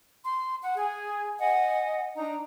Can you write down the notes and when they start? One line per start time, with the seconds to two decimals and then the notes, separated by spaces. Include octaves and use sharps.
0.23 C6
0.62 F#5
0.76 G#4 G#5
1.39 D#5 F#5 G#5
2.16 D4 D#4 A#5